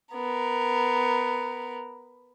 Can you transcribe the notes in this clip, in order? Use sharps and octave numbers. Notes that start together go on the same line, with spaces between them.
B3 A#4